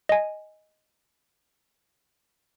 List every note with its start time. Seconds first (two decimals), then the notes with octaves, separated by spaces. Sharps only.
0.09 D#5 G#5